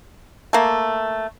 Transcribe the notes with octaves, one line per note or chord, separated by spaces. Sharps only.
A3 A#3